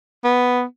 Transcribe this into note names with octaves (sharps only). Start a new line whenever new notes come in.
B3